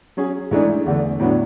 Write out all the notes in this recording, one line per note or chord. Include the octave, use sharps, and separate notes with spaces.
F#3 C#4 G#4
G#2 E3 A3 D4 G#4
E2 D3 A3
A2 F#3 B3 D4